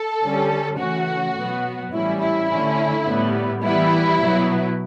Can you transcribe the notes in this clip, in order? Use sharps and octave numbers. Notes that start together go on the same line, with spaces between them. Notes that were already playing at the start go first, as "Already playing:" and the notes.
Already playing: A4
D3 G3 C#4
C#3 E3 A3 C#4 F#4
B2 F#3 B3
A2 E3 G3 C#4 E4
E4
D3 A3 C#4
A2 G3 B3
E3 G3 B3 E4
B2 F#3 B3